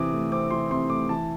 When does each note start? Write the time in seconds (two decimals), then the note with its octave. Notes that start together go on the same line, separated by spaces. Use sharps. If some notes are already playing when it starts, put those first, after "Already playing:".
Already playing: C3 E3 C4 D6 D#6
0.13 A3
0.31 C4 D6
0.51 E3 C6
0.70 C3 C6
0.90 A3 D6
1.09 E3 A5